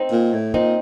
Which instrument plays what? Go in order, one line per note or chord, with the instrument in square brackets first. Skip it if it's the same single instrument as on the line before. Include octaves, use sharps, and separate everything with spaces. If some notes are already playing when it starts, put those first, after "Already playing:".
Already playing: [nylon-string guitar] C4 D#4
[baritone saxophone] A#2
A2
[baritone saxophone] A#2 [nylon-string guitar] C4 D#4